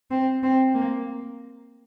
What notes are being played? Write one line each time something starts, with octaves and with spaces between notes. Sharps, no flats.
C4
C4
A#3